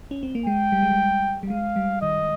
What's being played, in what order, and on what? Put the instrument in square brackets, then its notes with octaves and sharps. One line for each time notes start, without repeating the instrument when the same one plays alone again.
[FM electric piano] C#4
C4
A#3
[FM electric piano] G#3 [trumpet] G5
[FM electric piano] G3
G#3
G3
G3
[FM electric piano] G#3 [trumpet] F5
[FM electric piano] G3
[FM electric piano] D#3 [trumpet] D#5